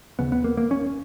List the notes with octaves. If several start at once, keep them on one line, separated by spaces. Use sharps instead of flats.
D#2 C#3 B3
B3
A#3
A#3
C#4